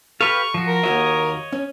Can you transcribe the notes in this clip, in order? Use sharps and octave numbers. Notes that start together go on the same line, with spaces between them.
G4 A4 B4 F5 C#6
F3 F#4
A#4
D#2 F#4 C#5 D#5 E5
C#4